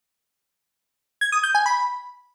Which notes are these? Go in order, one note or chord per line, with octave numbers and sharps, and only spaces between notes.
G#6
D#6
G6
G#5
B5